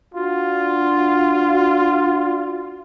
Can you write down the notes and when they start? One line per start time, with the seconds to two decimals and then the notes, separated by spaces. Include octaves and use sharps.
0.15 D4 F4 F#4